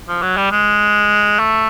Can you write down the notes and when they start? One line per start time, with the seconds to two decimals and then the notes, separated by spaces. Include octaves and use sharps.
0.09 F3
0.23 F#3
0.37 G3
0.52 G#3
1.39 A3